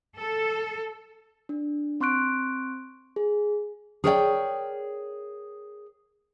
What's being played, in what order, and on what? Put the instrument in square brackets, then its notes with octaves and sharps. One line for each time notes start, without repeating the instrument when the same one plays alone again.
[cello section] A4
[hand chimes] D4
C4 C6 C#6 F#6 D7
G#4
[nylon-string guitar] G#4 A#4 C#5 D5 E5 G5